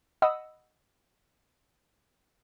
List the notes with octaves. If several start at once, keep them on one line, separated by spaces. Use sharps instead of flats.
D#5 F#5 B5 D#6 E6